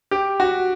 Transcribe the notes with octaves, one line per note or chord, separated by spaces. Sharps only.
G4
F#4